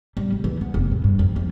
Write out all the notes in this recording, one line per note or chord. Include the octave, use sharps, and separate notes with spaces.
G3
D2
E3
B3
F1
A2
G2
F2
F3